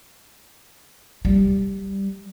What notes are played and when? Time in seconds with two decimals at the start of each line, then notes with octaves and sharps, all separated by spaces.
1.25 G3